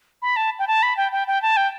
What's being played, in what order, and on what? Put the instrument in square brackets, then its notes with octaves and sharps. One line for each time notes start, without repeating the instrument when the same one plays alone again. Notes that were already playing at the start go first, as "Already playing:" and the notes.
[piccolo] B5
A5
G5
A5
B5
G5
G5
G5
A5
G5